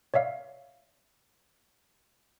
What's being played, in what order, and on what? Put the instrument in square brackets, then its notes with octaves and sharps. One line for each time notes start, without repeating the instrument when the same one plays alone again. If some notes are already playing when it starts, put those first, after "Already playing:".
[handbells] C#5 D5 E5 F5